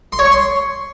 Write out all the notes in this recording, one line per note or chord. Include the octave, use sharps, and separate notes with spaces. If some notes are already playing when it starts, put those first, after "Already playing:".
C6
C#5
C#6
C6